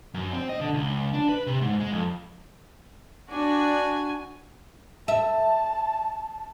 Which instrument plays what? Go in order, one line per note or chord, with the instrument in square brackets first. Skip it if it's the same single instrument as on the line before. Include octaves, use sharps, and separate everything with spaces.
[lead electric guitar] F#2
C4
D#5
D3
C#2
D4
B4
C3
G#2
G#3
F2
[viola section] D4 [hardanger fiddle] F#4 G#5
[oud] E5 [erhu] A5